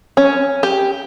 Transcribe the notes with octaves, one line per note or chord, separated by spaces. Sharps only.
C#4
G4